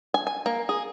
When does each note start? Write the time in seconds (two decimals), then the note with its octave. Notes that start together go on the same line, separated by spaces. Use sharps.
0.14 G#5
0.27 G#5
0.46 A#3
0.69 G#4